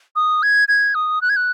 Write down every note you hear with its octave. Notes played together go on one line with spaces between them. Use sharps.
D#6
G#6
G#6
D#6
F#6
G#6
F#6